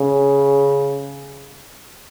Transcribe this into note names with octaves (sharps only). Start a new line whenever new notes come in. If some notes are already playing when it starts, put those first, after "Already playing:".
Already playing: C#3